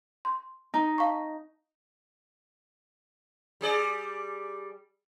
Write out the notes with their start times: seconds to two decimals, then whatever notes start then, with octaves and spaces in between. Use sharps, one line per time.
0.25 C6
0.74 D#4
0.98 F5 A5 C#6
3.61 G3 G#4 D5